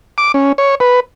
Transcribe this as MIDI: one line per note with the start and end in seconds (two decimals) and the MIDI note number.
0.18 0.32 86
0.34 0.52 61
0.58 0.75 73
0.80 1.00 71